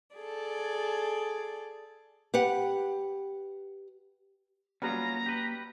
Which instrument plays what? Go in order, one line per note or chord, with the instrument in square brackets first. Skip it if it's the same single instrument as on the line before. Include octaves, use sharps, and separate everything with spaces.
[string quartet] G#4 A4 D5
[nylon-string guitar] G4 B4 F#5
[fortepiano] F#3 G3 B3 [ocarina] A#3 [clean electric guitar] C#4 F4 [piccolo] A#5
[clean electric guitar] G4 B4